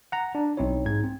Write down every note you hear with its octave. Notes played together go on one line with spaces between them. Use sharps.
F#5 A#5
D4
B1 C4 D#4 E4 C#5
G#2 G#6
C4